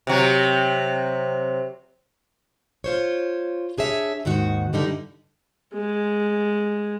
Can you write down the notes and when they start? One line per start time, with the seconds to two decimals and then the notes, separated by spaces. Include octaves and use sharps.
0.07 C3 F#3
2.84 F4 C5 C#5
3.78 D4 G#4 C#5 E5
4.25 D#2 G#2 D#3 F#4
4.73 G2 D3 G3 D#4 E4
5.74 G#3